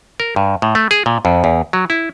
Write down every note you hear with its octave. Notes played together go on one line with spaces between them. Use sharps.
A#4
G2
A2
A3
G#4
A#2
F2
E2
F#3
E4